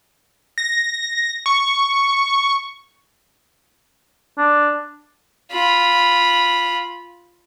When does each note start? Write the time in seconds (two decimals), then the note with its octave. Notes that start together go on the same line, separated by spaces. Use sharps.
0.58 A#6
1.46 C#6
4.38 D4
5.51 F4 B5